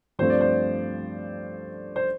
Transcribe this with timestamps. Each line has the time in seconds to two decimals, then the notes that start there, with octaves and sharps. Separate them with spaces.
0.19 G2 F3 A3 C4 C5
0.30 D5
0.41 C5
1.96 C5